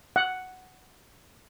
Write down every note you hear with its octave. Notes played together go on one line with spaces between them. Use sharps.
F#5